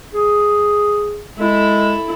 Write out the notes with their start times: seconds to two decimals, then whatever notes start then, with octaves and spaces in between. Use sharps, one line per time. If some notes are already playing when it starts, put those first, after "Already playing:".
0.13 G#4
1.38 G#3 E4 A4